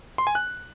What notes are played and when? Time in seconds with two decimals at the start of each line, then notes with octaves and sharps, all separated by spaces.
0.18 C6
0.27 G#5
0.35 F#6